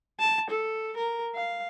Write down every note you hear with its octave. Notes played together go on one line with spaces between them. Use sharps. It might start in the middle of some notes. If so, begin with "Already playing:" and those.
A5
A4
A#4
F5